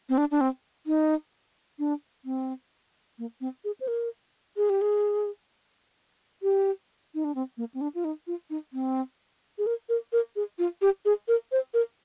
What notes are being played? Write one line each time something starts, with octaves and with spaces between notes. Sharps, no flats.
C4
D4
D4
C4
D#4
D4
C4
A#3
C4
G#4
C5
A#4
G#4
G4
G#4
G4
D#4
D4
C4
A#3
C4
D4
F4
D#4
F4
D#4
C4
G#4
A#4
A#4
A#4
G#4
F4
G4
G#4
A#4
C5
A#4